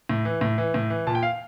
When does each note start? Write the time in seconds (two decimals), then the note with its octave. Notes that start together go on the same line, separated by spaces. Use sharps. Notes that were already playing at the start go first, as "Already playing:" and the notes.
0.09 A2
0.25 E3
0.41 A2
0.58 E3
0.74 A2
0.90 E3
1.07 A#2 A5
1.15 G5
1.23 F5